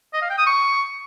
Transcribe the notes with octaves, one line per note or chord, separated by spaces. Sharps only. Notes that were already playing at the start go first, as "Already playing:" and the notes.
D#5
F5
G5
D#6
C#6